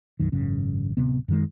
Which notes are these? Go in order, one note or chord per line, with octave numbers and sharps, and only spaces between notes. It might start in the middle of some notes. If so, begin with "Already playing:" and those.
B1 F#2 D#3
G#1 F#2 C#3
D1 F2 C3 B3
F#2 D#3 G#3